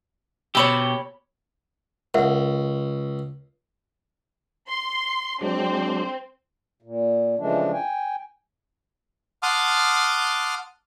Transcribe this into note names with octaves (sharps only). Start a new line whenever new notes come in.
B2 G4 C#5 B5 E6
C#2 A#4 E5 F#5
C6
F#3 G#3 C4 D4
A#2
C#3 E3 F3 G#3 A3 D4
G5 G#5
F#5 A5 C6 D6 D#6 F6